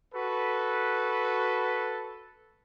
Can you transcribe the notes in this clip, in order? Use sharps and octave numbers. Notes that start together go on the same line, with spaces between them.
F#4 A4 B4